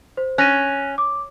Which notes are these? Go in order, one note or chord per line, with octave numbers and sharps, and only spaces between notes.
C5
C#4 F#6 A#6 D#7
D6